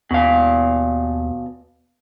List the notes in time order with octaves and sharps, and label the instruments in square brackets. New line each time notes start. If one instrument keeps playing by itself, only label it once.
[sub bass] D#2 [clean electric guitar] B2 F5